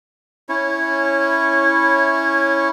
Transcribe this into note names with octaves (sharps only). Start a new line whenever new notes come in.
C#4 E4 C#5